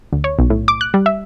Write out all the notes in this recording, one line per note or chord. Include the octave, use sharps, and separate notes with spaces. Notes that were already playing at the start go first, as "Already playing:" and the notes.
D2
C#5
B1
A2
D6
F#6
G3
E5